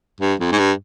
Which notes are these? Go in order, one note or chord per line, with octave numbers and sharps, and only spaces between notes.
G2
F2
G#2
G2